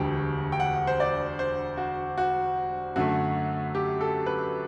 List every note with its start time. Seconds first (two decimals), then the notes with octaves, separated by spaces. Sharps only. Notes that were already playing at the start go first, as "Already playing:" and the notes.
Already playing: E1 D2 D3 G3 G5
0.52 G5
0.60 F#5
0.87 C5
1.00 D5
1.39 C5
1.77 F#4
2.18 F#4
2.96 F#2 D3 A3 F#4
3.75 G4
4.01 A4
4.26 B4